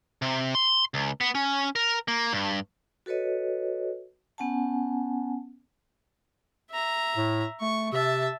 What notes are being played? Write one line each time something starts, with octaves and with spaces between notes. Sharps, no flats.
C3
C6
C#2
B3
C#4
A#4
A#3
G2
F#4 A4 B4 C#5 D#5
B3 C#4 F#5 G#5 A5
E5 A#5
A2
A3 C#6
C3 E5 A5